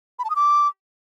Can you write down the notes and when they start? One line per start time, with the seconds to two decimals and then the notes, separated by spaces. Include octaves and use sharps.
0.19 B5
0.25 A5
0.30 D#6
0.36 D6